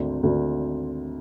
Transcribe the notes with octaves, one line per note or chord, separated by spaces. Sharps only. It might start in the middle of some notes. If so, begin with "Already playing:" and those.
Already playing: G#1 D2
D2